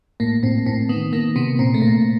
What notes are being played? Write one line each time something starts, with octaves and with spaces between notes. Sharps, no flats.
A2 A#3
A2 C4
A2 C4
D#3 B3
D#3 A#3
C3 B3
A#2 C4
A3
A#2 A#3